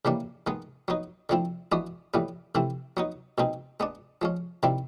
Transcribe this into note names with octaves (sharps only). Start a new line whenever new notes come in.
C#3 E3 G3 A#3 D4
D#3 G#3 B3
F#3 B3 D#4
D3 F3 A3 C4 E4
E3 G#3 B3 D4 F#4
A2 E3 G3 B3
C3 E3 A3 C4 E4
F#3 B3 D#4
B2 G#3 C4 D#4
G#3 B3 D4
F3 G#3 C#4
C3 D#3 G3 C4 E4